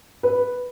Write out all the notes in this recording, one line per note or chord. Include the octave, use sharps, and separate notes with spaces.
B4